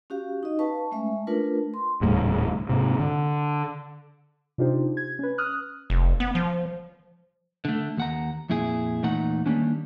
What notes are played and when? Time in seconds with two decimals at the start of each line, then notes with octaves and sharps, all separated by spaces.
0.10 C#4 F#4 G4 F5
0.43 D#4 D#5
0.59 B4 F5 A5 C#6
0.92 G#3 A3 C#4 E5
1.27 A3 D4 F4 A#4 B4
1.74 C6
2.01 D#1 C#2 A2 G3
2.69 G#2 C3
2.99 D3
4.58 C3 D4 D#4 F4 G4 C5
4.97 G#6
5.19 C#4 B4
5.38 D#6 F6 F#6
5.90 F1
6.20 B3
6.35 F3
7.65 D3 A3
7.97 D#2 F#5 A#5
8.50 F2 A#2 E4 G#4
9.03 E2 A#2 A3 D#4 F#5 A#5
9.46 D#3 G3 A#3 C#4 D4